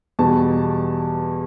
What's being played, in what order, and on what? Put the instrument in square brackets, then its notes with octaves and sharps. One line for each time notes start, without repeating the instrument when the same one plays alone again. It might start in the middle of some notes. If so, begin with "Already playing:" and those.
[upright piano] E2 B2 G3 B3 A5